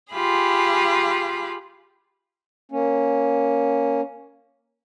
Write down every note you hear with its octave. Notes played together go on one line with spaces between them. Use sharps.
F4 G4 G#4 B5
A#3 C#4